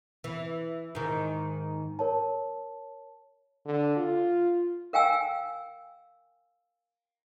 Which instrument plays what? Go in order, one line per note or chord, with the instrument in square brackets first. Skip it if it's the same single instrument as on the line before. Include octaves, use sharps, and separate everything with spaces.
[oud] E3
G#2 D#3
[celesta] A#4 C#5 A5
[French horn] D3
F4
[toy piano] A#4 F5 G5 G#5 E6